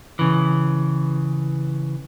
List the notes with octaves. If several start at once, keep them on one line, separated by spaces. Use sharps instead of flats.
C#3 E3